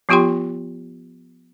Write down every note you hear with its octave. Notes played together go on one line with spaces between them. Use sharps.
F3 B3 F4 G4 G5 C6